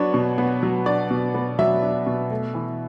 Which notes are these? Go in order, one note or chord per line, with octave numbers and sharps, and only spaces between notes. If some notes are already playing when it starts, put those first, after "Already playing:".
Already playing: F#3 B3 D4 C#5
B2
B3
F#3
D4 D5
B2
B3
F#3 E5
D4
B2
A3
E3